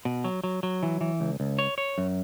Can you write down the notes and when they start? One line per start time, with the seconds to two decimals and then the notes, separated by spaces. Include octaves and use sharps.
0.05 B2
0.24 F#3
0.44 F#3
0.63 F#3
0.83 E3
1.01 E3
1.20 C#2
1.40 C#2
1.59 C#5
1.78 C#5
1.98 F#2